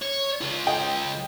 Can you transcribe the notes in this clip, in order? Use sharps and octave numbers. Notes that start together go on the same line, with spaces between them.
C#5
C#2 F4
D#5 G5